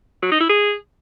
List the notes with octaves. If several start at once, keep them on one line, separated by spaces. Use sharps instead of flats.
F#3
D#4
E4
G#4